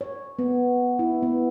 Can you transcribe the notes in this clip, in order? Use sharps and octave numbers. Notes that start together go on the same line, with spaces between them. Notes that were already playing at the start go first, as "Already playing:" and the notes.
C#5
B3
E4
B3